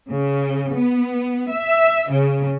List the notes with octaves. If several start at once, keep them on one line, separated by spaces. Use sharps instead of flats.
C#3
B3
E5
C#3